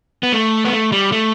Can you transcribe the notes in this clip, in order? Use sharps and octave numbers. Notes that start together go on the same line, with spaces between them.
B3
A3
B3
A3
G3
A3